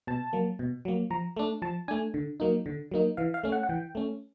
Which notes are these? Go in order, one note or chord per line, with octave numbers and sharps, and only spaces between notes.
B2 A5
F#3 A#3
B2
F#3 A#3
F3 A#5
A3 D4
F3 A5
A3 D4 G#5
D3
F#3 A#3 D#4
D3
F#3 A#3 D#4
E3 F5
F5
A3 C#4
F#5
F#5
E3 G5
A3 C#4